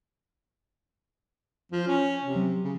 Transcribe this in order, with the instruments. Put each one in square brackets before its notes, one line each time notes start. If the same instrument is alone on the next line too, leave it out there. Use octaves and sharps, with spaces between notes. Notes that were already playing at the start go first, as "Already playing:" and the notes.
[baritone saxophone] F3
C#4
C3
[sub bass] F#3
[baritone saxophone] C#3